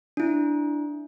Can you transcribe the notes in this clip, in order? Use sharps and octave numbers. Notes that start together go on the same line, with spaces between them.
D4 E4